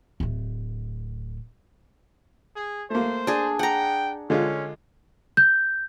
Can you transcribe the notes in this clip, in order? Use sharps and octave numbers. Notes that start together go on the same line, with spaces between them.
D1 A3
G#4
A3 A#3 C5
D4 G#4
F#5 G5 A#5
D3 G#3 C#4 F4
G6